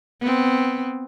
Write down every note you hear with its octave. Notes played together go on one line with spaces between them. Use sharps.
B3 C4